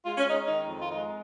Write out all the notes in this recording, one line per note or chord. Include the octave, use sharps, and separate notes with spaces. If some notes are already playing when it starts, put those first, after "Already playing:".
G#3 F4
C#4
G#3 D#4
D#3 D#4
F2
F4
G#3 D#4